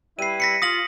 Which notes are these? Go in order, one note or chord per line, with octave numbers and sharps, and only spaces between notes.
G3 E4 B4 C7 D#7
A#6 B6 C#7
F4 D#6 A#6 F#7